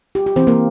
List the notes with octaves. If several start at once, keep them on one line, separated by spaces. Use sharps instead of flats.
F4 G4
G4
E3 C4 C5
A#3 A#4